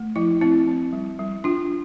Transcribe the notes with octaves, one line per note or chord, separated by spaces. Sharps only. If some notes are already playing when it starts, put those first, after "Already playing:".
Already playing: A3
F3 E4
C4 E4
C4
G3
G3
D4 F4